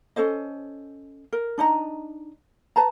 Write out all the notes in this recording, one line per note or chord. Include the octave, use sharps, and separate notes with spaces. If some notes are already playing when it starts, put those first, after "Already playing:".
C#4 A4 C5 D#5
A#4
D4 D#4 D#5 A#5
B4 A5 A#5